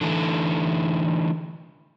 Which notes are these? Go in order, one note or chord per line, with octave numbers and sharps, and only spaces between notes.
D3 E3 A3